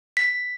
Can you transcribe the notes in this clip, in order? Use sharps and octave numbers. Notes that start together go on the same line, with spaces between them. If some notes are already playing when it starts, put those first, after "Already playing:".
B6